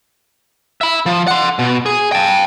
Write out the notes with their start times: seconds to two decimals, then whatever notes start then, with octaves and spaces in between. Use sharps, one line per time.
0.81 E5 B5
1.06 F3
1.27 F#5 C6
1.59 B2
1.86 G#4
2.12 G5 A5